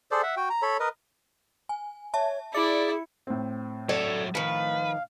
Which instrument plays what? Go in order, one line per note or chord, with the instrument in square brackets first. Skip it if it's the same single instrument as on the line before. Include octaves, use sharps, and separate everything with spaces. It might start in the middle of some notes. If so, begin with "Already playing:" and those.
[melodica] G#4 A4 C5 D5
E5 F#5
F#4 G5
A#5
A4 C#5 B5
A#4 B4 D#5
[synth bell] G#5
[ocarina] C#5 [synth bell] E5 A5
[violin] E4 [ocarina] G#4 [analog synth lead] D5 [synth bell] C#7
[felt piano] A2 C4
[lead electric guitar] F#3 E5 [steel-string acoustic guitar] A4 C#5 D5
[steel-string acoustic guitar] D#3 F3 [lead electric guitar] B4 [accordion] F5